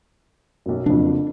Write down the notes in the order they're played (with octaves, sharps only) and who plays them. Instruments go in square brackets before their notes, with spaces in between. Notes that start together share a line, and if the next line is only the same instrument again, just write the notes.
[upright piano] B1 F#2
[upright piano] F#1 F2 [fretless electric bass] D4